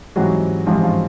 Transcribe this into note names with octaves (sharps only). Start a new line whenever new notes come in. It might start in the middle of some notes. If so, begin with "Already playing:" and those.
G#2 E3 F#3 G3 C4 F#4
G#2 E3 F3 G3 C4 F4
F3 F4